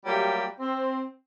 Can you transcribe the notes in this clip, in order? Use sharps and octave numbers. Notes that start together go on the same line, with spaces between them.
F#3 G3 A3 A#3 F4 G4
C4